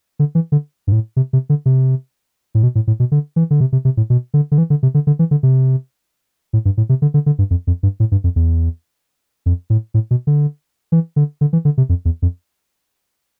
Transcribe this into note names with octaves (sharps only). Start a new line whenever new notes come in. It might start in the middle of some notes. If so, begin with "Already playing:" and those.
D3
E3
D3
G2
A2
C3
C3
D3
C3
A2
B2
A2
A2
B2
D3
E3
D3
C3
C3
C3
A2
B2
D3
D3
E3
D3
C3
D3
D3
E3
D3
C3
A2
G2
A2
C3
D3
D3
D3
G2
F2
F2
G2
A2
G2
F2
E2
F2
A2
A2
B2
D3
E3
D3
D3
E3
D3
C3
F2
E2
F2